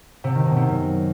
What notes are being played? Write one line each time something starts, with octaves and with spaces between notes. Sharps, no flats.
C3
D#3
B2
C3
F#2